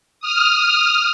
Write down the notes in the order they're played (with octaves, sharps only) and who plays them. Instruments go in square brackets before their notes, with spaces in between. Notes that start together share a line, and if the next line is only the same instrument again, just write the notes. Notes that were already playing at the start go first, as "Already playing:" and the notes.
[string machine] D#6 F6